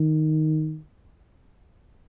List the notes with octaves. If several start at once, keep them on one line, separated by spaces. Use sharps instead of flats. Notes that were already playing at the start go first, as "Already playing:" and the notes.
Already playing: D#3